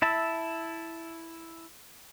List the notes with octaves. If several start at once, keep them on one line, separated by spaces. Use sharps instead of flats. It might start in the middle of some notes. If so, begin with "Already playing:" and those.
E4 E5 A5